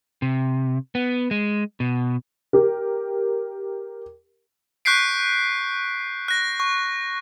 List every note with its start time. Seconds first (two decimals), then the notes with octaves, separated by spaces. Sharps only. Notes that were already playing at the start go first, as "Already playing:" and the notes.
0.22 C3
0.95 B3
1.31 G#3
1.80 B2
2.53 G4 A#4
4.85 C#6 F#6 G6 B6 C7 D7
6.28 F#6 A#6
6.60 C#6